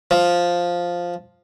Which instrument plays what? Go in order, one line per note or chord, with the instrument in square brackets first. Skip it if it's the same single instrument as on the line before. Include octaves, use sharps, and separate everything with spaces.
[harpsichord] F3